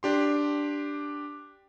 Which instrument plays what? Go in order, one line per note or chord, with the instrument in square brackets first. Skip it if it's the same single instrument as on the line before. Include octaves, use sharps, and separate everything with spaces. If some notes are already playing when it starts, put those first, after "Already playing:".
[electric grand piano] D4 G4 C6